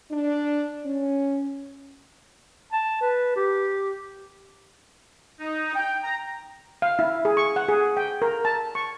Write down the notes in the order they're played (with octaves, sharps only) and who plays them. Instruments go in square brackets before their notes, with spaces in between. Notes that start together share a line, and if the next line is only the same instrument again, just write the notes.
[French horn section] D4
C#4
[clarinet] A5
B4
G4
[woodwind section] D#4
G5
A#5
[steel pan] F5
E4
G#4
C#6
F#5
G#4
G5
A#4
A5
C#6